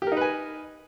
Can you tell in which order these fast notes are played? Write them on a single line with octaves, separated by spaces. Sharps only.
G4 A#4 D#4 B4 G#5